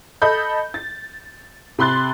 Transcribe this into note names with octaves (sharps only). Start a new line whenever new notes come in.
A4 D#5 B5 G6
A6
C3 B5 C6 F#6 A6